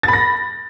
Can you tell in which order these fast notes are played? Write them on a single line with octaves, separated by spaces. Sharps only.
A6 B5 A#6